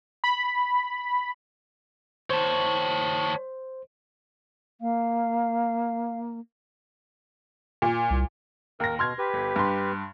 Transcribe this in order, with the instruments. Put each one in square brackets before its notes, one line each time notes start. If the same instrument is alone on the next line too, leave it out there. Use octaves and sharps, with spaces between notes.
[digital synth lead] B5
[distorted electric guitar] D#3 F#4 [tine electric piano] C5 [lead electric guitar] C#5 A5
[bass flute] A#3 [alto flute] F5
[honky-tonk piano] A#2
[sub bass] C2
[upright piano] D#2 A#6 [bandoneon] A#4
[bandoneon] B2 [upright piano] C6 F6 G#6
[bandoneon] G4 B4
[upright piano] G1
G2 C6